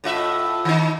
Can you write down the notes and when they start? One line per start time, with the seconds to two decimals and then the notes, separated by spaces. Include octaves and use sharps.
0.04 A2 F4 E5
0.65 D#3 D#4